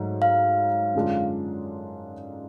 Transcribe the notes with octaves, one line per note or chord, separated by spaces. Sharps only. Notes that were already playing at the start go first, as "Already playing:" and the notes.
Already playing: G#2 F#3 A3
F5
F#2 D3 G#3 D4 F4